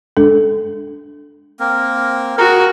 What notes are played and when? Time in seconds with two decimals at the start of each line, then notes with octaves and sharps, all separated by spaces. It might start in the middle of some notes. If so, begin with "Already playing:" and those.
0.17 G#3 D4 A4
1.60 A#3 C4 A#4
2.38 F#4 G#4 A#4